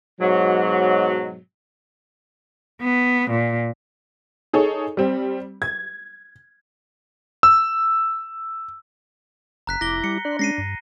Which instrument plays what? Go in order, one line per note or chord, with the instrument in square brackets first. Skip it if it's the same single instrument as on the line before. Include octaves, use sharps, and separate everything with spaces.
[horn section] G#2 B2 F#3
[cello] B3
A#2
[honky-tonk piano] D#4 G#4 A4 C#5
G3 C4
G#6
[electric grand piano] E6
[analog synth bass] F#1 [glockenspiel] A#5 F#6 B6
[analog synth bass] F1 [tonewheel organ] E4 A#5 D6 [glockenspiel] A#6 G7
[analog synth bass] G3 [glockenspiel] C#7
[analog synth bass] D4 [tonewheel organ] D5 C6 F#6
[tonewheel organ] G#3 C#4 [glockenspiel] A#6 C7 D#7
[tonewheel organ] G2